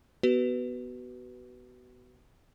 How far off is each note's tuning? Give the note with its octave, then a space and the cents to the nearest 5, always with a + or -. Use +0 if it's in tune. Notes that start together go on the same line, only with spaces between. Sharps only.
B3 +0 F#4 +30 B4 +0